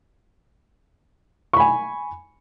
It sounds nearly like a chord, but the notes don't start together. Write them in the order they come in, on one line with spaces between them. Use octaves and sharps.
C#6 B5 G#5